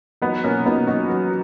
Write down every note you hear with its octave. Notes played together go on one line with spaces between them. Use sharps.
F#3 B3 D#4
B2 A#3 C#4
B2 B3 D#4
F#3 D#4 F#4
F#3